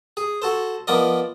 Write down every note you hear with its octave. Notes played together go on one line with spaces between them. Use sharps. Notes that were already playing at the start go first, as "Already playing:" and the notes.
G#4
F#4 A4 C5
F3 B3 A#4 D5 D#5